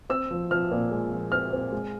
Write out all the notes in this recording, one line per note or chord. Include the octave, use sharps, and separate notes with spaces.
C4 E6
F3
F3 F6
A#2
G#3
F3
C4 F6
C4
G#3